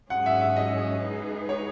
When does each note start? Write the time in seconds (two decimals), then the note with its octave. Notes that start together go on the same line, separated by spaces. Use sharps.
0.10 G#2 F#3 C#4 G#4 F#5
0.26 E5
0.41 E5
0.56 D#5
1.03 G#3 D#4 G#4 B4
1.49 C#5